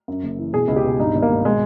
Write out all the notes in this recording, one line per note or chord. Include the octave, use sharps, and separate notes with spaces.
F#2
F#1
E3
B2 G#4
C#2
G4
B2
G2 D#4
G#1
A#3
G#1
B2 G#3